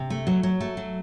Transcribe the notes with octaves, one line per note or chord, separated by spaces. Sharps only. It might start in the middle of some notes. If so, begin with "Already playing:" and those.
Already playing: C3
A3
F#3
F#3
A3
F#3